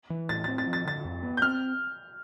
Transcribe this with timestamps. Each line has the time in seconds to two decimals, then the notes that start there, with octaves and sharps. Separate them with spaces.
0.10 E3
0.29 A2 A6
0.44 A6
0.48 C4
0.58 A6
0.67 F3
0.73 A6
0.85 D3 A6
1.05 F2
1.23 B3
1.37 G6
1.42 C4 F6